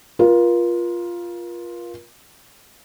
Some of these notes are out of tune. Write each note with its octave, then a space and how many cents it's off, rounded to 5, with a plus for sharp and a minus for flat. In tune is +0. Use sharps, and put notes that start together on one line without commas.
F4 +0 A#4 +40